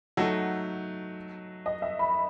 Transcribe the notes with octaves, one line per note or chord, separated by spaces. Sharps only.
F#3 A3 D#4 A4 F#5
D#5
E5
B5